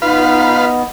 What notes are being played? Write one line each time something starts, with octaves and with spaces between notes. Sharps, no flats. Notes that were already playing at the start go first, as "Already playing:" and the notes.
B3 D#4 F4 B4 F5